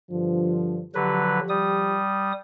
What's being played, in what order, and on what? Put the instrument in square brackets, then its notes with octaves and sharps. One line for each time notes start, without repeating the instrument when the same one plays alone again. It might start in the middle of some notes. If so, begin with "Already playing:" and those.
[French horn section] G2 D3 F3
[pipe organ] D3 F#3 B4 [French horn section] F3 G4
[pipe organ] G3 D#6